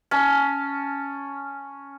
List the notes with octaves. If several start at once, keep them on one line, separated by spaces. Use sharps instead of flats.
C#4 A5